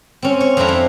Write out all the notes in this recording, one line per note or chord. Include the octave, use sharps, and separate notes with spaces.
C4 C#4
C#5
F2 C4 D4 E4 A#5
C4